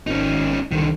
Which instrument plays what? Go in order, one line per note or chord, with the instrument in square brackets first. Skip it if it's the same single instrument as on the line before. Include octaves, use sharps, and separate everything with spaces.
[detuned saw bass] G#1 [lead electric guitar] C#4 D#4
[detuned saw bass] C2 [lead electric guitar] D3 D#3